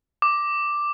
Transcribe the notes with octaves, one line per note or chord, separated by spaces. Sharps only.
D6